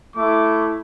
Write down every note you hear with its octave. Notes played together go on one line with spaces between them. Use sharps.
A3 E4 D6